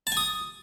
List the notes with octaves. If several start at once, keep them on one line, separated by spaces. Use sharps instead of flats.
A5
G#5
D#6